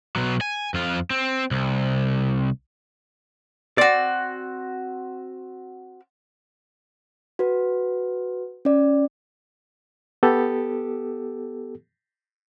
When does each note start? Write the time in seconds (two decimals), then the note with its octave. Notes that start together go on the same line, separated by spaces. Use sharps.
0.16 B2 F#3
0.41 G#5
0.74 F2 F4
1.10 C4
1.51 C2
3.78 C4 F#4 D5
7.39 F#4 B4
8.65 C#4 D5
10.23 B3 G4 A4